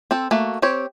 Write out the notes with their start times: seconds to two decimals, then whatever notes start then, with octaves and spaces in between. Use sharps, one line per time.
0.11 C4 A4
0.31 A3 A#3 F#4
0.62 C4 G4 C#5